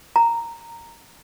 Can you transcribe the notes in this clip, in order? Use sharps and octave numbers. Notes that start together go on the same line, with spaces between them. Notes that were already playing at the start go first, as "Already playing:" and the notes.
A#5